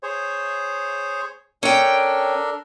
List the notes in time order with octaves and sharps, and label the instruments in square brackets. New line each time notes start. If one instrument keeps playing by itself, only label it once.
[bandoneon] G#4 C5 C#5
[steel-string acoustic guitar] C#4 G5 [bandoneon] D4 A4 A#4